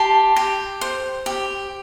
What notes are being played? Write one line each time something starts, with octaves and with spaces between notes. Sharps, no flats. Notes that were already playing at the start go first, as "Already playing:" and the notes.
Already playing: G4 A5 C6
G4
C5
G4